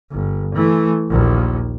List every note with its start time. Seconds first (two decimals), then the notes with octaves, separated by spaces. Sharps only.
0.12 G1
0.54 E3 A3
1.10 A#1 D#2